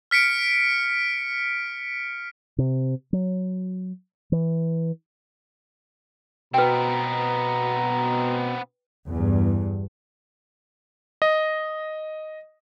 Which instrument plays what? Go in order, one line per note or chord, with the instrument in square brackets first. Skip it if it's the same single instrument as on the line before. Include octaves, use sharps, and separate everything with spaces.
[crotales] F6 B6 C#7 D7
[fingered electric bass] C3
F#3
E3
[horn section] B2 [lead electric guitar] B3 C4 [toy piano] B4 G5 [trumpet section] A#5
[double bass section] E2 G2
[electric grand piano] D#5